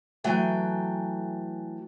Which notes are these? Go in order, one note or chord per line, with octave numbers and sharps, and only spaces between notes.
E3 F#3 A3 G5 G#5